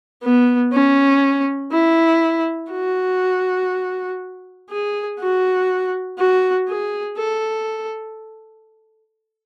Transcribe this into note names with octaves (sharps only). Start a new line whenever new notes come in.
B3
C#4
E4
F#4
G#4
F#4
F#4
G#4
A4